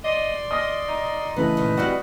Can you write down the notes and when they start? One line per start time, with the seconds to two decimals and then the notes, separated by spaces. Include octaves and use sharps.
0.04 D5 D#5 C6
0.51 D#5 D#6 F6 A#6
0.88 D#4
1.36 C#3 E3 A3 B3 B4 D#5
1.57 A#2 D#3
1.77 G3 C4 E4 F#4 F6 F#6